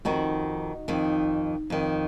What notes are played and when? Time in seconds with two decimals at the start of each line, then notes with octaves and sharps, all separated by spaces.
0.05 F2 D#3 D#4 F#4
0.88 F2 D#3
1.70 F2 D#3